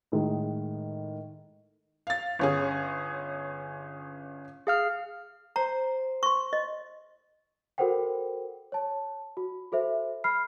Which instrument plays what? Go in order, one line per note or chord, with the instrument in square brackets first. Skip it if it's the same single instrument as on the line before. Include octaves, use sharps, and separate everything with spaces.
[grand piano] A2 D#3 G#3
[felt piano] F5 A6
G1 C#4 G#4
[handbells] G#4 F5 F6
[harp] C5 [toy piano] A#5
[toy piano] C6 C#6
D#5
[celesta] F#4 A4 A#4 C5 F#5 G5
C#5 A5
F#4
F#4 A4 C5 E5
B5 F6 C7